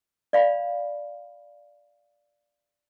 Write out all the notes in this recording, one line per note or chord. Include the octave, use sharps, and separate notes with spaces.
D5 F5 B5